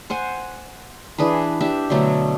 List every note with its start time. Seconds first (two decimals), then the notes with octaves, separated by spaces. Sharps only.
0.10 C5 F#5 G#5
1.18 E3 D4 G#4 B4
1.60 D4 G4 E5
1.90 B2 D3 F#3 A3